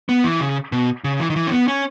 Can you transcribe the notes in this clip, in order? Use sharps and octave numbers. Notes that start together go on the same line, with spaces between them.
B3
E3
C#3
B2
C#3
E3
D#3
E3
C#4
B3
C#4